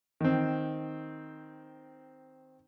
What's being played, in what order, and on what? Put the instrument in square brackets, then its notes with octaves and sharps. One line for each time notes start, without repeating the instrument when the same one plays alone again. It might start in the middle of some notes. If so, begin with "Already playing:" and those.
[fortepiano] D#3 C4